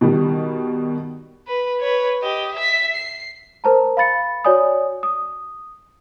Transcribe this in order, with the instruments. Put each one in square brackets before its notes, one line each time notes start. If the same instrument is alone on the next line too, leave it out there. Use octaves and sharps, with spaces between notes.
[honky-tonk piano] B2 D#3 G3
[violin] B4
B4 C#5
G4 D#5
E5 B6
C7
[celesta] A#4 C5 A5 A#5
F5 B5 A6 C#7
F#4 C#5 D5 G#5 D#6
D#6